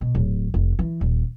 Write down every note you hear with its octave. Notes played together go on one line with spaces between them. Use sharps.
B2
D1
F1
E3
D#1